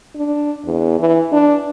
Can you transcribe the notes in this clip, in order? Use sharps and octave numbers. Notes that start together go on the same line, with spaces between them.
D4
E2
E3
D4